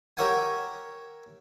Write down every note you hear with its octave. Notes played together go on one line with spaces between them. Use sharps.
G4 A#4 C#5 E5 F#5 G#5